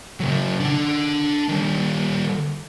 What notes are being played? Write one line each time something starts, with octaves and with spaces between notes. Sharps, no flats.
C#3 F#3
D4 F#5
D#3 G3